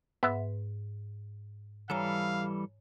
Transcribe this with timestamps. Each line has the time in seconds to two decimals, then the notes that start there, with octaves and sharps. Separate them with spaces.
0.23 G#2 B3 E5
1.90 E3 G3 A4 C#5 F5 G#5 A#5